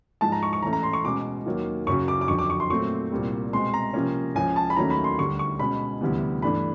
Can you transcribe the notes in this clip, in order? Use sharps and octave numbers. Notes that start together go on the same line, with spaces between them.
G#2 F3 G#3 A5
A#5
C#6
C#6
A2 E3 A3 C#4 A#5
A#5
C6
C#6
B2 G#3 C#4 D6
D#2 D#3 F#3 A#3
F#2 C#3 F#3 C#6
D6
D6
F2 D3 F#3 C#6
D6
C#6
C6
A#2 F#3 A3 C4 C#6
C2 A#2 G3 C4
B2 G#3 C4 C6
A#5
C3 F3 A#3 C#4
C#2 C#3 F3 G#5
A5
B5
D#2 D#3 F#3 A3 C#4 A#5
B5
C6
D2 D3 G3 C#6
C#6
B2 G#3 C#4 B5
D2 C3 E3 G3 B3
G2 E3 A3 D4 B5